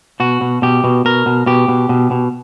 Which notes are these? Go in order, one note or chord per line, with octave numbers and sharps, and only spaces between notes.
B2 F#4
B2
B2 G4
B2
B2 A#4
B2
B2 G4
B2
B2
B2